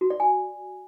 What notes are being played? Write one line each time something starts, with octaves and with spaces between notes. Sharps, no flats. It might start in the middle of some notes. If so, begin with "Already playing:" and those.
F#4
D5
G#5